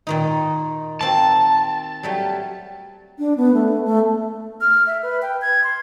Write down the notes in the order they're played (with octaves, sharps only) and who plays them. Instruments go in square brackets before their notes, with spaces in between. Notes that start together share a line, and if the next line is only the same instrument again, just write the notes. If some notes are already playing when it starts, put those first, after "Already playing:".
[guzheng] A#2 D#3 D#4
[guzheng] A#3 C4 F#4 [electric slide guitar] A5
[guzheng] F#3 G3 A3
[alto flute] D4
B3
A3
A3
[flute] F6
E5
B4
G5
G#6
C6